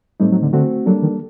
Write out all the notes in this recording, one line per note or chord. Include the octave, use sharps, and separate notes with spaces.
A2 G3 A3 C4 D#4
F#3
D3
D3 A3 C4 F#4
F#3 G3 A#3 D4 A4
D#3